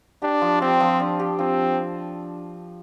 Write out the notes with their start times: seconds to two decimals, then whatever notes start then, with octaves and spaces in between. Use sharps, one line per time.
0.22 D4 G4
0.42 F3
0.61 C4 G4
0.80 F3
1.00 D4
1.20 G4
1.39 F3 C4